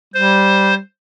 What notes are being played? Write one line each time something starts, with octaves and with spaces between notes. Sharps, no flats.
G3 C5